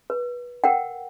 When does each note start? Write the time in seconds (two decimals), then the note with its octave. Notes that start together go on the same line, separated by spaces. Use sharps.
0.10 B4
0.64 A#4 F#5 G5